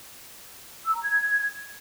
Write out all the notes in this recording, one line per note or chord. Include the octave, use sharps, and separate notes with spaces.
E6
A#5
G#6